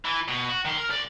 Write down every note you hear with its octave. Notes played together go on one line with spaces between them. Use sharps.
E3
B2
F#4
D#3 C6
A#4
C2 D5